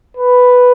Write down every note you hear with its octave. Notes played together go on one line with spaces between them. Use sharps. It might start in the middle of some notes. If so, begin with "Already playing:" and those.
B4